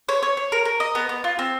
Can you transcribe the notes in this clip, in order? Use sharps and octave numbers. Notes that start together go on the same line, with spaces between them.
C#5
C#5
C#5
A#4
A#4
D#5
B3
B3
F4
C4